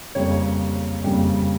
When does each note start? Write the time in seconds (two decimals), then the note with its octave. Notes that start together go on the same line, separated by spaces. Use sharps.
0.15 F2 C#3 G3 A#3 C#5
1.04 F2 C#3 G3 A#3